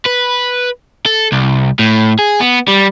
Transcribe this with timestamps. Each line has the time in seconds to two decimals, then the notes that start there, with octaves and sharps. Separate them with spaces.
0.05 B4
1.06 A4
1.32 C2
1.79 A2
2.19 G#4
2.40 B3
2.68 G3